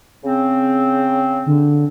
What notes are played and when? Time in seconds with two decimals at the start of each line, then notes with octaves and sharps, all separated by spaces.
0.24 C#3 C4
1.46 D3